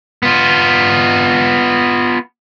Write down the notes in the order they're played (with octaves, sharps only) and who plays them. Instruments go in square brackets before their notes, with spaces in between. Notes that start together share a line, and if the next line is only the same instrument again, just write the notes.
[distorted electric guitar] B3 F4